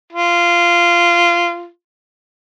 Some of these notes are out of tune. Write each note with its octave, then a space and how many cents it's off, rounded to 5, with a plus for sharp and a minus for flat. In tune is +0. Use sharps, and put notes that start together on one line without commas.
F4 -15